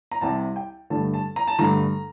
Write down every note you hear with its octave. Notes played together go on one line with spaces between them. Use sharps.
A#5
C2 C3 G3 A5
G5
G2 D3 A3 A5
A5
A#5
A5
G2 D3 A3 A#5